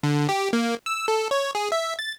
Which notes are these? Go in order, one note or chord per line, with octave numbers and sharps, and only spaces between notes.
D3
G4
A#3
E6
A4
C#5
G#4
E5
A6